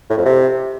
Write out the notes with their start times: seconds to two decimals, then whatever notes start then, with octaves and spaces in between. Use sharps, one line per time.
0.10 A2
0.18 F2
0.26 C3